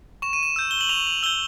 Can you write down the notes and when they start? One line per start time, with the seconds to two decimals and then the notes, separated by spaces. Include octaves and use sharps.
0.22 C#6 E7
0.33 D#7
0.43 E7
0.56 E6 G6
0.71 G7
0.81 F#7
0.89 C#6 F7
1.07 F#7
1.23 E6 G6 G7